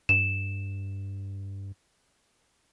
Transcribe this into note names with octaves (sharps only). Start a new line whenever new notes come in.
G2 E7